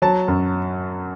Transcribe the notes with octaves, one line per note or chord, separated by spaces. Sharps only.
F#3 A5
F#2